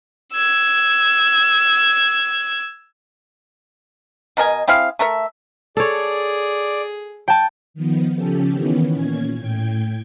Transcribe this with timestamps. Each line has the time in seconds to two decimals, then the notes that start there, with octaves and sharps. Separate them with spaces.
0.33 E6 G#6
4.37 B2 A#4 D#5 G#5
4.68 C4 E4 G#4 F5
4.99 A3 A4 A#4 E5
5.77 G#4 A4 C#5 D5
7.28 G5 A5
7.74 D#3 F3 B3
8.16 C#3 F3 C#4 G4 A4
8.50 D#3 E3 B3 C#4
8.94 A#2 C#4 G#6
9.38 A2 G5 G#6